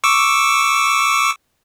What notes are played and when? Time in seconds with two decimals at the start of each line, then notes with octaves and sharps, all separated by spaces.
0.04 C#6 D6 E6